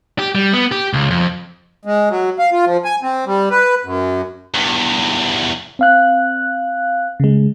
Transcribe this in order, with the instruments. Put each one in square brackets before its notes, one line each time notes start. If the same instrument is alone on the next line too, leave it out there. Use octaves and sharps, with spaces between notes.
[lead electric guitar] G4
G3
B3
G4
C#2
F2
[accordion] G#3
F#3
F5
F4
F3
G#5
C4
G3
B4
F#2
[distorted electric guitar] E2 G2
[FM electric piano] C4 F5 F#6
C#3 G#3